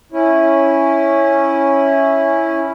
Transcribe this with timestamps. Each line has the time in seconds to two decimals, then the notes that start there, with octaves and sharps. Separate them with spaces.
0.12 C#4 E4